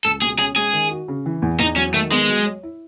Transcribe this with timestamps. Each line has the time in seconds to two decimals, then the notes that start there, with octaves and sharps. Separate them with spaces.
0.05 C#2 A4
0.22 B2 G#4
0.39 C#4 G#4
0.56 G#3 G#4
0.73 D#3
0.91 F#4
1.08 C#3
1.26 E3
1.42 E2
1.59 E2 D#4
1.76 F#3 C#4
1.94 D#3 A3
2.11 G#3 B3
2.29 F#3
2.45 C#5
2.63 E4